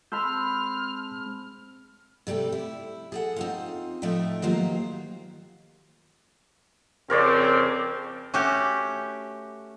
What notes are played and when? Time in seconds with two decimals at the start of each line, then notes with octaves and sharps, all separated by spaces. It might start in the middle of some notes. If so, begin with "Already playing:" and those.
0.12 G#3 C4 A5 B5 C6 E6 F6 G6
2.27 C3 G3 A3 C4 G4
2.52 E4
3.12 G#4 A4 F#5
3.36 C4 D#4 F4
4.02 A2 F3 A3 D#4 E5 G5
4.42 D#3 F#3 A#3 F4 G4 C5
7.10 F2 C#3 C4 A#4 C#5 D5
8.34 A3 C#4 F#4 G4